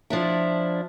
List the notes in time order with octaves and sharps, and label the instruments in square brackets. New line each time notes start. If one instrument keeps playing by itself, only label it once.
[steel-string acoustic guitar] F3 D4 E4